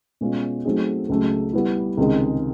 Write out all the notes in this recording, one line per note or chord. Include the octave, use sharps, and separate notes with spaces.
B2 G#3 C#4 F4
F#3 A3 C4 D#4 G#4
C#2 C#3 F#3 A3
G3 B3 E4
C#2 C3 D#3 G#3